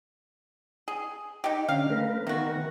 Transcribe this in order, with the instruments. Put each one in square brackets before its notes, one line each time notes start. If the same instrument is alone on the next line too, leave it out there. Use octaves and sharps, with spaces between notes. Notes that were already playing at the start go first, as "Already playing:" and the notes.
[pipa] G#4
D#4 G4
[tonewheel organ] D3 C#4 [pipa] F5
[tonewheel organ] A3 A#4 B4
[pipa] C3 F#4 [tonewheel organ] D#3 B3 A#4